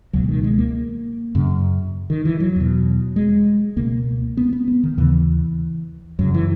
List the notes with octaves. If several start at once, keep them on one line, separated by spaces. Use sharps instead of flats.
C#2 B2 F#3
D#3
G#3
A#3
F#2 C#3
D#3
E3
F#3
E2 B2
G#3
C#2 B2 A#3
B3
B3
B3
D#3
D#2 C#3 E3
F#2 C#3 F#3
E3